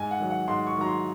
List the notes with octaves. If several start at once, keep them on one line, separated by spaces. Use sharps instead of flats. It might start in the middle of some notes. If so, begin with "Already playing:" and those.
Already playing: G#2 G#5
F#5
D#3 F#3
F#5
G#2 C6
C#6
D#3 F#3 A#5
C6